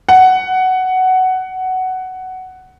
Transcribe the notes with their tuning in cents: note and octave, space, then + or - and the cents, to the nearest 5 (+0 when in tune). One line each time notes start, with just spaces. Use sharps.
F#5 +10